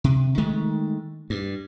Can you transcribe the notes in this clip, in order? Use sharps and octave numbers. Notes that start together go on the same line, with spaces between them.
C3
D#3 G#3 A3
G2